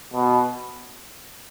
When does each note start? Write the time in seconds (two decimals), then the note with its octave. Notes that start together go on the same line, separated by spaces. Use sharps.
0.14 B2